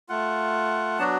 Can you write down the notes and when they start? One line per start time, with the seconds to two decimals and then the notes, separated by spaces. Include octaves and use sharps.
0.09 A3 F4 F#5
0.99 F#3 B3 D4 F#4 A5